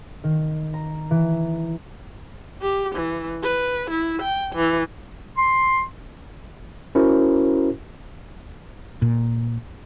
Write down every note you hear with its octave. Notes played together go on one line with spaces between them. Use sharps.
D#3
A#5
E3
G4
E3
B4
E4
G5
E3
C6
C#4 E4 F#4 A#4 C5
A#2